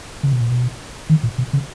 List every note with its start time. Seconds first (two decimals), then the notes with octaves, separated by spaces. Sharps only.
0.23 C#3
0.33 B2
0.41 A#2
0.50 B2
1.09 D#3
1.23 A#2
1.38 B2
1.53 C#3